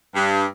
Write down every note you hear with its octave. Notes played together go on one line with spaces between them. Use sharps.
G2